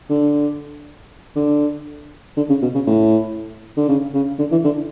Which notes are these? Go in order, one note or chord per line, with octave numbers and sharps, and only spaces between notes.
D3
D3
D3
C#3
B2
C#3
A2
D3
C#3
C#3
D3
E3
D3